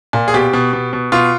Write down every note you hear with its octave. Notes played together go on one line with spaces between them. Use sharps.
A#2
G#4
B2 G4
B2
B2
B2
B2 F4